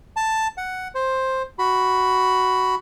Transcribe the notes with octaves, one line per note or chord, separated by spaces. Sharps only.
A5
F#5
C5
F#4 B5